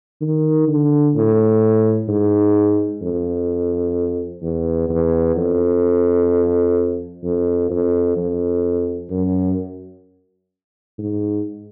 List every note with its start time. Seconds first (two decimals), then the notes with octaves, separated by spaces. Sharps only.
0.21 D#3
0.68 D3
1.15 A2
2.09 G#2
3.02 F2
4.42 E2
4.89 E2
5.36 F2
7.24 F2
7.70 F2
8.17 F2
9.10 F#2
10.98 G#2